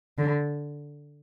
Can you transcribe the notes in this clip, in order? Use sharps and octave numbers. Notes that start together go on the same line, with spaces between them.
D3